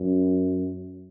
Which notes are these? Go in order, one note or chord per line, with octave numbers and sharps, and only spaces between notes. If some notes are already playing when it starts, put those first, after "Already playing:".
Already playing: F#2